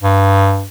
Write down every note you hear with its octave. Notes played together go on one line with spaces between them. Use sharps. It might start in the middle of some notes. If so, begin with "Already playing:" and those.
G2